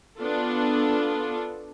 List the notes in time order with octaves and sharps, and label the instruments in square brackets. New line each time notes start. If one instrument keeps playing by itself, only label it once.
[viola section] B3 D4 F4 A4